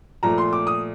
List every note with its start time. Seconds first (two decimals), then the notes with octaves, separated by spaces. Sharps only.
0.23 A#2 F3 A3 A#5
0.38 C6
0.53 D6
0.67 D#6